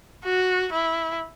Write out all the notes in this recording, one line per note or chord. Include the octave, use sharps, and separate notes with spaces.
F#4
E4